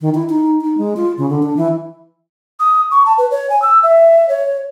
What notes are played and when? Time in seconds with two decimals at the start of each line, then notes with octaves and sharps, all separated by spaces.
0.01 D#3
0.15 E4
0.29 D#4
0.61 D#4
0.78 G#3
0.97 F4
1.18 C#3
1.30 D3
1.43 D4
1.57 E3
2.60 D#6
2.91 C#6
3.06 A5
3.18 B4
3.31 C#5
3.50 G#5
3.62 E6
3.83 E5
4.29 C#5